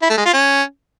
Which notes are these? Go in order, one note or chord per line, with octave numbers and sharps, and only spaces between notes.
E4
A3
G#3
F4
C#4